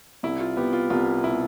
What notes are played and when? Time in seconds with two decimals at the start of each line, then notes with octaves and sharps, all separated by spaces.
0.23 C2 E4
0.40 F4
0.57 B3 G4
0.73 F4
0.90 C2 F4
1.23 B2 E4